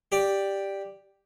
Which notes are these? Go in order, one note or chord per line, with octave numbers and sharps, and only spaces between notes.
G4 D5